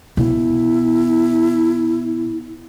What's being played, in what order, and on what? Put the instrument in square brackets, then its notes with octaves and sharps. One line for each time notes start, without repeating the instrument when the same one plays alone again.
[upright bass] B2 [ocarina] E4